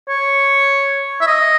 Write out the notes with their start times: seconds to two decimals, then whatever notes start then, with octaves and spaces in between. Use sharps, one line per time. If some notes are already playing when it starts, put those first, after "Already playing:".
0.08 C#5
1.21 E5
1.27 D#5